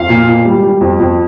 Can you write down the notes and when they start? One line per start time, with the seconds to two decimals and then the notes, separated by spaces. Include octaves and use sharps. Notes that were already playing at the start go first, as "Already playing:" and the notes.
Already playing: F2 F5
0.09 A#2
0.27 A#2
0.45 G3
0.63 G3
0.81 F2
1.00 F2